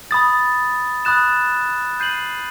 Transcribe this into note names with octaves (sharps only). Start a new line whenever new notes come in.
B5 D#6 A6
B5 D#6 F#6 A6 E7
G6 C7 D#7 F#7